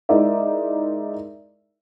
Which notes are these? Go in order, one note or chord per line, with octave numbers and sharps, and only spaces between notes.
G#3 D#4 E4 A#4 D5 E5